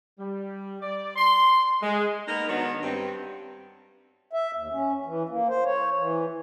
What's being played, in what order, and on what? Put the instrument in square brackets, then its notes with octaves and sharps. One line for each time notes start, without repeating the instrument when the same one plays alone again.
[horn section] G3
D5
C6
G#3
[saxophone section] A#3 B3 D#4 A#4
D#3 F#3 B3 D4
G2 C4
[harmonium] E5
D#2
C#4
E3
A#3
C5
C#5
E3